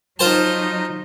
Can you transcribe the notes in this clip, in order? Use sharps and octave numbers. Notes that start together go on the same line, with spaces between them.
F#3 D#4 F4 C5 A5